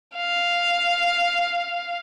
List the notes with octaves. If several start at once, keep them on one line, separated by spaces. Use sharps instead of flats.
F5